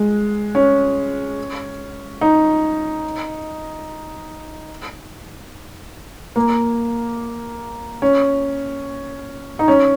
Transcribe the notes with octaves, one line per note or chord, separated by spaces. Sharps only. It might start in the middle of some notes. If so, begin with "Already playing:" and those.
Already playing: G#3
C#4
D#4
A#3
C#4
D#4
C#4